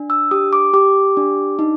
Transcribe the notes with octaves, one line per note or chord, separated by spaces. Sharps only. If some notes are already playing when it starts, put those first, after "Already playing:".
Already playing: D4
E6
G4 D#6
D6
G4 D6
D4
D#4